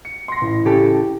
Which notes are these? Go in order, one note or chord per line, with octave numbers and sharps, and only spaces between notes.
C#7
C6 A#6
A1
C#3 G4 A4